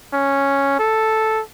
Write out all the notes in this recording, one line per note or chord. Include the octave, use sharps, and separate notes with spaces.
C#4
A4